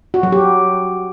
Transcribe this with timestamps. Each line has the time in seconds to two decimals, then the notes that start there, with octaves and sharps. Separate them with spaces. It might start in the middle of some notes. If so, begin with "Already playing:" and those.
0.14 F#4
0.23 F#3
0.32 G4